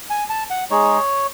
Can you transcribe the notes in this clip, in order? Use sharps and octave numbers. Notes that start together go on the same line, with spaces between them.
G#5
A5
F#5
G#3 D#4 G#4 C#5